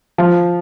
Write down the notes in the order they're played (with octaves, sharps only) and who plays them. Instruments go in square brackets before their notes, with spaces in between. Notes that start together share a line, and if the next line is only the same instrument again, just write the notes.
[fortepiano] F3